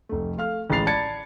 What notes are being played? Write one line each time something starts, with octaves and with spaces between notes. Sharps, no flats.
F1 A3
A3 F5 F6
A1 G#3 B5 A6 C7 F7
D5 A5 B5 G#6 A6 C#7